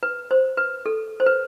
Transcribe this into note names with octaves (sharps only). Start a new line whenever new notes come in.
B4
C5
B4
A4
C5
B4